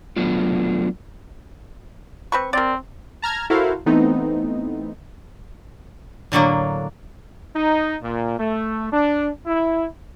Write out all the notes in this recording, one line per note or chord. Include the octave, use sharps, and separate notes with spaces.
F#3 A3 B3 D4 F4
C4 B4 C#6
C4 A#4 D5
A5 A#5 F6 G#6
E4 F#4 A4 A#4 C5 F5
E3 A3 B3 C4 D#4
A2 D3 F#3 A#3
D#4
A#2
A3
D4
E4